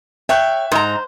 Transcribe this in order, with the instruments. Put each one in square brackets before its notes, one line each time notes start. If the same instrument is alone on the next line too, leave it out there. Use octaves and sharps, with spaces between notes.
[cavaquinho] C#5 G5 [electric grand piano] E5 F#6
[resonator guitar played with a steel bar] G#2 A#5 [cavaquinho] C5